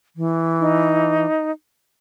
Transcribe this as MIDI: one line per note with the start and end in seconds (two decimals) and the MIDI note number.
0.16 1.26 52
0.60 1.51 63